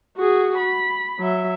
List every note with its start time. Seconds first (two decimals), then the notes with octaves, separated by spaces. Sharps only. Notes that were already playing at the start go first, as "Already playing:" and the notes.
0.17 F#4 G#4
0.58 B5
1.19 F#3 E5